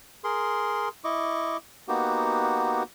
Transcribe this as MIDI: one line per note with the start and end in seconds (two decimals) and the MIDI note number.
0.24 0.89 68
0.24 0.89 70
0.24 0.89 84
1.04 1.57 64
1.04 1.57 75
1.04 1.57 85
1.04 1.57 86
1.88 2.83 58
1.88 2.83 59
1.88 2.83 63
1.88 2.83 66
1.88 2.83 67